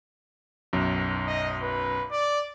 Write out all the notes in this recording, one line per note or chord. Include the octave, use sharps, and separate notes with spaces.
B1 F#2
D#5
B4
D5